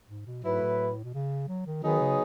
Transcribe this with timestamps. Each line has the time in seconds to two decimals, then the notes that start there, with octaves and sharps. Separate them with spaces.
0.09 G#2
0.26 B2
0.44 G#2 F#3 A3 E4 B4
0.61 A2
1.04 B2
1.14 C#3
1.48 F#3
1.66 D#3
1.83 D#3 F#3 B3 D#4 G#4 C#5
2.00 C#3